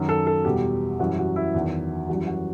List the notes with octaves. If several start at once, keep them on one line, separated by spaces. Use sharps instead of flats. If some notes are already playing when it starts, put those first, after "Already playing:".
Already playing: F#2 D#3 F#3
A4
A4
E2 B2 G3 G4
F#2 E3 G3 F#4
F#4
E4
E2 D#3 F#3
F#2 E3 G3 F#4
F#4